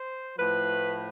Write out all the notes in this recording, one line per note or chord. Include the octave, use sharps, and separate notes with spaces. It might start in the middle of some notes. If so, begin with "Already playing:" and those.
Already playing: C5
A2 F3 B4